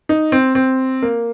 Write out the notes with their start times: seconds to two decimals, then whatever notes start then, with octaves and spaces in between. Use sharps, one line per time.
0.09 D#4
0.32 C4
0.55 C4
1.02 A#3